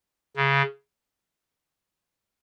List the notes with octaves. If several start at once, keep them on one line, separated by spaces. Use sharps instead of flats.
C#3